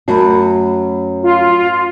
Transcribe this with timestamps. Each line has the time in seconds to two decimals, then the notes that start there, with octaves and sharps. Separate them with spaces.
0.08 F#2 A3 F#4 B5
1.21 F4